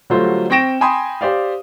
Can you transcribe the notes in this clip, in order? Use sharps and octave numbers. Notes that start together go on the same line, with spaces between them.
D3 F#3 G3 A3 F4 C5
C4 G5 C#6 A#6 D7 E7
G5 G#5 B5 C6 D#6
G4 C5 D5 F5